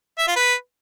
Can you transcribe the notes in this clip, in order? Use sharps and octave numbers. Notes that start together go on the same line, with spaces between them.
E5
F4
B4